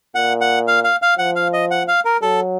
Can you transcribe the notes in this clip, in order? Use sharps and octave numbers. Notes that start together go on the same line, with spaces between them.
A#2 F#5
F#5
F5
F5
F5
F3 F#5
F5
D#5
F#5
F5
A#4
F#3 A4